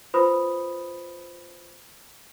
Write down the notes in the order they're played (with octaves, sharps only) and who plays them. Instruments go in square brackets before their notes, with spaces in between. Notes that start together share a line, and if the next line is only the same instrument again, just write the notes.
[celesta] F4 B4 C5 B5 D#6